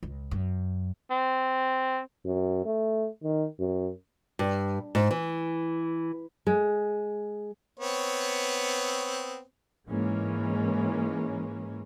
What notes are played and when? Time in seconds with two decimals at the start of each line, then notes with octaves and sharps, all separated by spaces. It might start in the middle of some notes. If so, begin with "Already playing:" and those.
0.03 C#2
0.31 F#2
1.11 C4
2.25 F#2
2.65 A3
3.23 D#3
3.59 F#2
4.39 G2
4.95 G#2
5.11 E3
6.47 G#3
7.80 B3 C4 C#5
9.88 G#2 E3 G#3 A#3 C#4